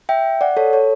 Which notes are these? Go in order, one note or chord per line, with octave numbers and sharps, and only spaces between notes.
E5 G5
D5 F#5
A4 C#5
A4 C#5